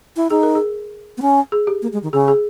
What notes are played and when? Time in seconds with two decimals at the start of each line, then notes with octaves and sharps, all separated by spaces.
0.16 E4
0.30 D#4 G#4
0.43 A#4
0.55 G#4
1.17 B3
1.22 C#4
1.52 G#4
1.67 G4
1.82 A#3
1.93 G#3
2.03 D#3
2.13 C#3 G#4
2.28 G#4